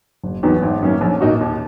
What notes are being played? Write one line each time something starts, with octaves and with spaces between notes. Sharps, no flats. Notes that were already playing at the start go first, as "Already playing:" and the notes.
F#1
E2 D#3 F#3 B3
G#1
F#2 D#3 A#3 C#4
A#1
A#2 A#3 D#4 F#4
D#2